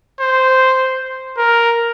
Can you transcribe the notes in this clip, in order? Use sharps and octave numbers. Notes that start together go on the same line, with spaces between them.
C5
A#4